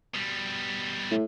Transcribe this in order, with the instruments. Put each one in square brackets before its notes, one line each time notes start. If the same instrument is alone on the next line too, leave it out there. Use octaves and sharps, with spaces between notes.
[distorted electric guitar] B2 G3
[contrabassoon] A2